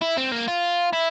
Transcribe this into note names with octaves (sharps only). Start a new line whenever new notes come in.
E4
C4
A#3
F4
E4